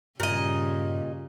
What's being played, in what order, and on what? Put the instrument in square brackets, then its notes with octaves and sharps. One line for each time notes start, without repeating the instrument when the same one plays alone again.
[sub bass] G2 [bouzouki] A#2 D#5 [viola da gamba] C#3 G3